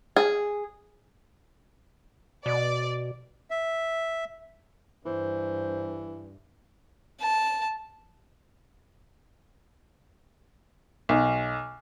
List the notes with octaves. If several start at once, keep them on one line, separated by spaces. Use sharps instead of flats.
G#4
B2 D5
E5
G2 E3 C5
A5
B1